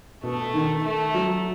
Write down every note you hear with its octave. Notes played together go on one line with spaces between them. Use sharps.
B2 A3
D#3
A3
F#3